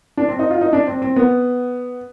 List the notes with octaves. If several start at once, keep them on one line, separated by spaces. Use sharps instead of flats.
D4
C4
D#4
F4
D#4
D4
C4
C4
B3